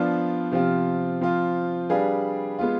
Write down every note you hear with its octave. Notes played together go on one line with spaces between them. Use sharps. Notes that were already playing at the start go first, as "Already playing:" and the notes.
Already playing: F3 B3 D4 F4
C3 F3 C4 F4
F3 C4 F4
G3 D4 G#4 B4 F5
G#3 B3 F4